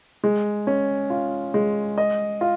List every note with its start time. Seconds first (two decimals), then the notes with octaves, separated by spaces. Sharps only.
0.24 G#3
0.67 C#4
1.10 F4
1.54 G#3
1.98 D#5
2.41 F4